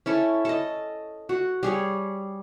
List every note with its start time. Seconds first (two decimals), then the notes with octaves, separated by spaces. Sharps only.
0.06 C#4 E4 A4
0.45 A4 D#5
1.29 F#4
1.63 G3 G#4 C#5